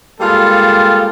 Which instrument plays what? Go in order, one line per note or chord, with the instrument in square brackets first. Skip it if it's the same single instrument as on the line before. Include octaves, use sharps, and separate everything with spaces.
[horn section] G3 G#3 A#3 F4 A4